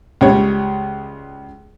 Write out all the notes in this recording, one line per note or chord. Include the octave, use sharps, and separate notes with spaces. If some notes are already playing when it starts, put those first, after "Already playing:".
C#2 C#3 G3 C#5